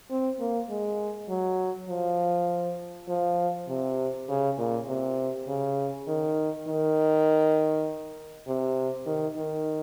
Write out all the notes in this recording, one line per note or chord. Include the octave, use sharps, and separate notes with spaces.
C4
A#3
G#3
F#3
F3
F3
C3
C#3
A#2
C3
C#3
D#3
D#3
C3
D#3
D#3